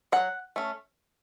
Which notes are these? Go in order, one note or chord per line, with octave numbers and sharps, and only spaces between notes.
F#3 F#5
A3 C#4